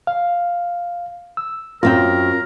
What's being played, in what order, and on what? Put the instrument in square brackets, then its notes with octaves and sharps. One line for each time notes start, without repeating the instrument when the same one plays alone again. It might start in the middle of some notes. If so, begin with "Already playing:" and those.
[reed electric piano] F5
E6
[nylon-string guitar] F#2 C4 G5 [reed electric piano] F4 [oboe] A#4